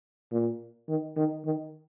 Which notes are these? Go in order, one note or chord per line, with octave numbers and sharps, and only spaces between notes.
A#2
D#3
D#3
D#3